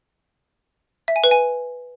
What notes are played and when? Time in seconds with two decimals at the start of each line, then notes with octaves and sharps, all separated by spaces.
1.08 E5
1.16 G#5
1.24 B4
1.31 G#5